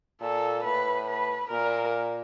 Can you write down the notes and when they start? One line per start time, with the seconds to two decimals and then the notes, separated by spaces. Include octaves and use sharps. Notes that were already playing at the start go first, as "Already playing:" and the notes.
0.21 A#2 A4
0.64 A2 B4
1.07 B4
1.51 A#2 A#4